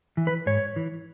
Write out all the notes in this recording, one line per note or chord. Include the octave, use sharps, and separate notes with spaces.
E3
B4
G#2 C#5
E3